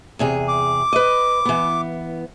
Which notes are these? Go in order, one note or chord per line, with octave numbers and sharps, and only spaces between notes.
E2 C3 G#4
D6
B4 D#5
E3 B3